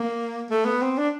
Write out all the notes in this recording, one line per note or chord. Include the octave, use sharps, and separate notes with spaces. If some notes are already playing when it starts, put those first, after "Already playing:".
Already playing: A#3
A3
B3
C4
D4